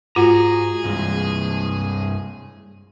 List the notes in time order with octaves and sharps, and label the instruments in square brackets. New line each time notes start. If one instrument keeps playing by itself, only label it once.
[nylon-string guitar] G#2 F#4 [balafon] F4 [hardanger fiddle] G#4 [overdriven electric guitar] A#5
[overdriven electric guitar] C2 G2 [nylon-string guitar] G#3